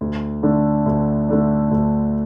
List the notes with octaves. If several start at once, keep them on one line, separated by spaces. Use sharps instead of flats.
D2
D3 A3 D4
D2
D3 A3 D4
D2